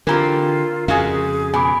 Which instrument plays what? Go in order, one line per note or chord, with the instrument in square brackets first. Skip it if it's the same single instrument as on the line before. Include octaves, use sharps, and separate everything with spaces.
[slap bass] D3 [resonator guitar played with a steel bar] E3 C4 G4 [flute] F4 [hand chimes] A#4 A#5
[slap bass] F2 C#3 [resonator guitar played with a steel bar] G#3 F#4 F5 [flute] G#4
[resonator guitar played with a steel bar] B2 [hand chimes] G#5 B5 D6